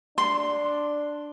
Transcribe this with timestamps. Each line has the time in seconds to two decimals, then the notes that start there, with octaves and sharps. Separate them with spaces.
0.18 D4 C6